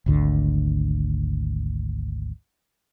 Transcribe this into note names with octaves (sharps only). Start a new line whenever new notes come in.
G#1 D2 D3